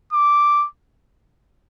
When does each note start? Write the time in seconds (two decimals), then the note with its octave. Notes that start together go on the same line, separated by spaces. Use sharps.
0.13 D6